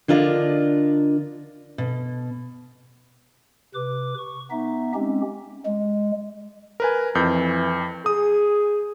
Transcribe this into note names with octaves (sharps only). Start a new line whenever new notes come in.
D3 D4 F4 A#4 D#5
B2
C3 B4 D6
C#6
B3 D#4 E5
G#3 C4 C#4 G4
G#3
A#4 B4 G#5
F2 E3 G6
G#4 D#6